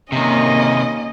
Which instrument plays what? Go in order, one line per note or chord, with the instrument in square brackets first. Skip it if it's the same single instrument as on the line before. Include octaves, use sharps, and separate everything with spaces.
[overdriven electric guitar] C3 D#3 [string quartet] A#3 C#4 [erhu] D#5